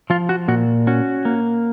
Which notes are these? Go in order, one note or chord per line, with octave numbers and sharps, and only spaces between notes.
F3 F4
F#4
A#2 F#4
C#4 F#4
A#3